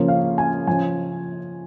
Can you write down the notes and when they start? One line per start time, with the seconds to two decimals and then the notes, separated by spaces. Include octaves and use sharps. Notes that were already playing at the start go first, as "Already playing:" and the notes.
Already playing: C#3 F3 A#3 C#4
0.08 F5
0.38 G#5
0.67 F3 C#4 G#5